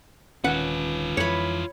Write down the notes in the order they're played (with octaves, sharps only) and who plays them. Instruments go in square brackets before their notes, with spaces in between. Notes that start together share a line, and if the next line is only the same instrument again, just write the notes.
[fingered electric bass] D#1 D#3 C#4 [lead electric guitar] F4 B4 [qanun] F#5
[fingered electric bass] F2 E3 [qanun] C#5 B5